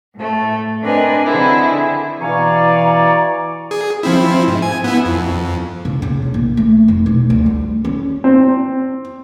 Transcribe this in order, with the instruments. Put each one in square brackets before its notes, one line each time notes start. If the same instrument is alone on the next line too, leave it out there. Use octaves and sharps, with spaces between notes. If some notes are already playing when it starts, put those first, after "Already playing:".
[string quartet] A2 A3
C4 D4 A#4 B4 D#5 G#5
D3 C4 E4 G#4
[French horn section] B2 E3 [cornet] D5 [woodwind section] F5 G#5 C#6 [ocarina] A#5
[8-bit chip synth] G#4
F3 C4 E4
G#2
G#5
B3 E4
F2
[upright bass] C#3
C#3
C3
A#1
A3
F1
B1
D2
G3
C#4
[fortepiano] C4